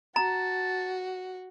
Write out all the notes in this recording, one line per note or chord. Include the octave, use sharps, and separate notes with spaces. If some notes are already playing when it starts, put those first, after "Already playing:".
F#4 A5 A#5